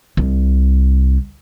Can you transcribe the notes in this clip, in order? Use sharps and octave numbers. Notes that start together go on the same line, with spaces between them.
C2